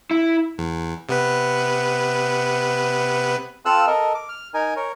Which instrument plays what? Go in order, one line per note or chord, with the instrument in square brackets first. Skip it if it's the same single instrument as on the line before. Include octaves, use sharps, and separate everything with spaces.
[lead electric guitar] E4
[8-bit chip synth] E2
C3 B3 B4
[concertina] C4 F4 A4 F5 E6 F#6
A4 A#4 D#5
D6
F6
D#4 A#4 G#5
A#4 C#5